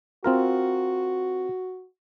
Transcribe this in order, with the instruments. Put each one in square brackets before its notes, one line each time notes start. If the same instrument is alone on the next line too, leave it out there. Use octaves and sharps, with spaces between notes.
[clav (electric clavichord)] C4 F4 A#4 [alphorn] F#4